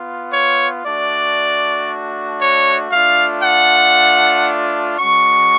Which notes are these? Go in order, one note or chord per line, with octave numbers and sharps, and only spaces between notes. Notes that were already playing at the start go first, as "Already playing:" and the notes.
Already playing: B3 F4
C#5
A3 D4 F#4 D5
C#5
A3 D4 F4 F5
F#5
G#3 C#4 F#4 C#6